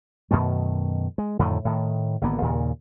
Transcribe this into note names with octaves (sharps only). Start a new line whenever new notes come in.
F#2 B2 D#3 A3
G#3
F2 A2 D3 D#3
A2 D#3
G#1 D3 A#3 B3
D#2 A#2 C#3